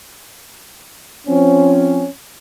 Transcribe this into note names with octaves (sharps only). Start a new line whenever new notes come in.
F3 C4 C#4